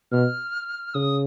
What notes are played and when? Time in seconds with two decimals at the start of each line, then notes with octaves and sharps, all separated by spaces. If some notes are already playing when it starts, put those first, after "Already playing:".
0.12 B2 F6
0.94 C#3 D#6